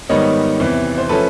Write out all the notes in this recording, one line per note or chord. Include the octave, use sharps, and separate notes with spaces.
G#2 D#3 G3 B3 D#4 C#5 D#5
E2 C3 E3
C5
F3 A3 C#4 A4 B4